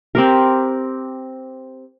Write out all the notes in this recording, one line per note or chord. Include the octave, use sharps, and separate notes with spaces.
C4 G4 A#4